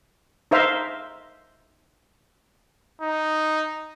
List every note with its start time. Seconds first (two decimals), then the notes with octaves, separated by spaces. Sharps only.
0.51 D#4 A#4 C5 E5 F5
3.01 D#4